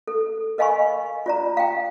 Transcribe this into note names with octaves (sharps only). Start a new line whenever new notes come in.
A4
A#4 D#5 F5 G#5 B5 C#6
F4 D5 A#5
F5 G5